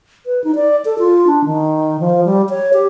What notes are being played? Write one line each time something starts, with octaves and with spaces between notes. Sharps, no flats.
B4
D#4
D5
A4
F4
D4
D#3
F3
G3
C#5
G4